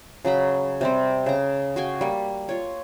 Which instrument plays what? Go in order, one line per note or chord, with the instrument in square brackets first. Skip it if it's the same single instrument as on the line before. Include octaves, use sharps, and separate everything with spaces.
[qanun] C#3 F#3 A#5 B5
C3 G3 C4
C#3 A#5
F#4 F5 G5 G#5
G3 A#3
F4 C#5